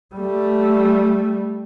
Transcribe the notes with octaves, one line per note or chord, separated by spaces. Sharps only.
G3 A3